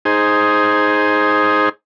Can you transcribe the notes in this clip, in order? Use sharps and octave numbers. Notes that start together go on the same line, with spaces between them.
D#4 G#4 C5